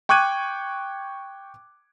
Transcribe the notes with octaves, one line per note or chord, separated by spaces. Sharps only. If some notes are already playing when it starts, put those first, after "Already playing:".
G5 C#6 D6 F#6 G#6 D#7